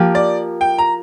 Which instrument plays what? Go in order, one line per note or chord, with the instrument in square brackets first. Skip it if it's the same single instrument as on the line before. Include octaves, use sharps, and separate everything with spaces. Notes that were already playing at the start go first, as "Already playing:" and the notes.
Already playing: [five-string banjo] F3 A#3 G4
[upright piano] D5
G5
A#5